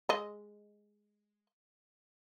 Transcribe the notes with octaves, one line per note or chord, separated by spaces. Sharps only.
G#3 D#5